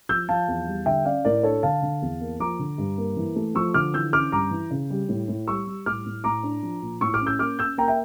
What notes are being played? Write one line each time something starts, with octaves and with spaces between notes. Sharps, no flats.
F3 E6 G6
F3 F5 A5
E2
G3
D3 E5 G5
C#4 D5 F5
A2 A#4 D5
D4 A4 C#5
D3 F5 A5
D3
E2
A#3
F3 A#5 D6
D3
G2
A#3
E3
A3
F3 C#6 E6
D3 D6 F6
E3 E6 G6
C#4 D6 F6
G2 A#5 D6
E3
C#3
G3
A2
A2
G3 C#6 E6
G3
A2 D6 F6
A2
A2 A#5 D6
D4
F3
A#2
A2 C#6 E6
D6 F6
C#4
E6 G6
A#3 D6 F6
C#4 E6 G6
A#3 G5 A#5
E5 G5